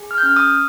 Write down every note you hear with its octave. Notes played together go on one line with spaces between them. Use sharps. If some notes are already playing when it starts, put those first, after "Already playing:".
Already playing: G#4
F6
G6
C#4 F6
D#6